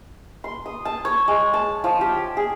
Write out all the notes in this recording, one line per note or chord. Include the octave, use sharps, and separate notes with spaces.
C6
D#6
A5
C#5
G#3
A5
F3
G4
G#4